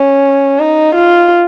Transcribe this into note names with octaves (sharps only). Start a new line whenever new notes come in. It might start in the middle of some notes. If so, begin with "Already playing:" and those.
Already playing: C#4
D#4
F4